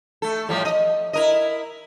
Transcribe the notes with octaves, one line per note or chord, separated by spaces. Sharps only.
A3 A4
A2 F3 G3
D#5
E4 A#4 D#5